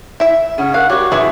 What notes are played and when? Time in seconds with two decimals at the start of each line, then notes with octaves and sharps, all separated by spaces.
0.20 E4 E5
0.58 C#3 C#4 F#5
0.74 A#4 F5 F#5
0.90 G3 F#4 G4 C#5 D6
1.12 A1 F#4 G#4 B4 E5